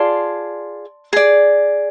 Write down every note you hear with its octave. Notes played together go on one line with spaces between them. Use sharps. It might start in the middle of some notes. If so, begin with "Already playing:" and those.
Already playing: F4 G#4 D5 A5 C6
G#4 D5